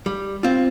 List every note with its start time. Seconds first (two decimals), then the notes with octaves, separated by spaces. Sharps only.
0.06 G3
0.43 C4 F4